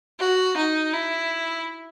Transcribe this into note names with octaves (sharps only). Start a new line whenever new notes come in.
F#4
D#4
E4